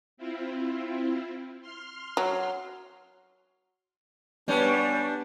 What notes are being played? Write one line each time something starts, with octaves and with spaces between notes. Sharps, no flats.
C4 E4 F4
C6 F6
F#3
G3 B3 C#4 D4